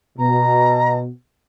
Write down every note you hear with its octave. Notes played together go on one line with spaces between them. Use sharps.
B2 A#5